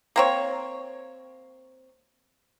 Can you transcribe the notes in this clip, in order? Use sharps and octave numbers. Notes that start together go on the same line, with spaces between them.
A#3 C4 C#5